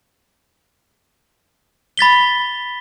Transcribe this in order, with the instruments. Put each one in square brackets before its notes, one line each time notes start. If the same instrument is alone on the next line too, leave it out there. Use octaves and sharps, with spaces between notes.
[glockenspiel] B5 A6 B6 G7